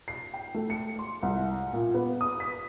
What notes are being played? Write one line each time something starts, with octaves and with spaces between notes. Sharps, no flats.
C7
G5
A3
C#7
C6
C2
A#2
B3
D#6
B6